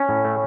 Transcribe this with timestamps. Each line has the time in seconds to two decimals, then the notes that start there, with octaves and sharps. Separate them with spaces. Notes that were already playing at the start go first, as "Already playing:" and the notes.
Already playing: C#4
0.09 A2
0.24 A3